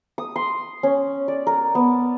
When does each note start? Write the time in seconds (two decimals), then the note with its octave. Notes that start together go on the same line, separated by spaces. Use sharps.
0.18 D#6
0.36 C6
0.83 C#4
1.28 D5
1.47 A#4
1.75 B3